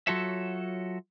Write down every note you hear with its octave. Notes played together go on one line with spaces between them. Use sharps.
F#3 F4 F#4 A4 C#5 E5